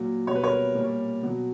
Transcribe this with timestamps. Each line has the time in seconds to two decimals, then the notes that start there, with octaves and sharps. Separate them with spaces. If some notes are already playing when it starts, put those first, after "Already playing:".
Already playing: A#2 F#3
0.27 B2 G3 C#5
0.35 B4
0.44 A#4 C#5
0.75 A#2 G3
1.23 B2 F#3